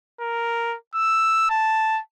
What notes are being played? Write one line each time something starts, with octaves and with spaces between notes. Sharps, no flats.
A#4
E6
A5